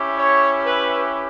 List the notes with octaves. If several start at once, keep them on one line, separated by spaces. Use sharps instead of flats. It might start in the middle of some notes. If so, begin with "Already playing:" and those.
Already playing: C#4 E4 G4
C#5
B4